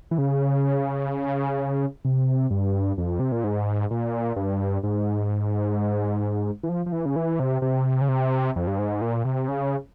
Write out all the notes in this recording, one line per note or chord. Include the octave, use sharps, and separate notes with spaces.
E3
C#3
C3
G2
F2
C3
A#2
G#2
A#2
G2
G#2
E3
F3
F3
E3
C#3
E3
C3
C3
C#3
C3
F2
G2
G#2
A#2
C3
C#3